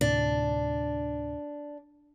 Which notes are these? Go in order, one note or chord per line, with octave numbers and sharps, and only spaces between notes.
D2 A2 C3 D4